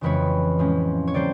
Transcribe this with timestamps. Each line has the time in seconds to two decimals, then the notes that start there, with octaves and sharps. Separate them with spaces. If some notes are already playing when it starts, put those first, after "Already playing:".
0.01 F2 C#3 E3 G#3 B4 C#5
0.59 A2 F3 G#3 C#4
1.07 C#5
1.14 D3 G3 A#3 C5 D5